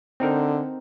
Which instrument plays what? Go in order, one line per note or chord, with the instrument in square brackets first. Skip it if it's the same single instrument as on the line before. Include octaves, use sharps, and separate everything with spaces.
[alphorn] D3 [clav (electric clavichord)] C4 D#4 A#4